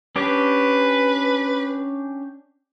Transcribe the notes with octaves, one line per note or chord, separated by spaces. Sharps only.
C#4 D4 G4 B4